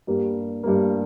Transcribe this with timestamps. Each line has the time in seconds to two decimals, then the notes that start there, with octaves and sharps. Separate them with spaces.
0.07 G2 G3 A#3
0.63 G2 G3 A#3